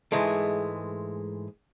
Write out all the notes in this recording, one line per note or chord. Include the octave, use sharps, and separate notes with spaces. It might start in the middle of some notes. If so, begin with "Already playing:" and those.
G#2 E3 G#3 A3